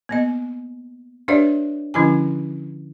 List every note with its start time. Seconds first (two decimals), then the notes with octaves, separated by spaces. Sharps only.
0.09 A#3 B3 D#5
1.28 D4 G4 B4 C#5 D5 E5
1.94 D3 F3 C#4 E4 G4 G#5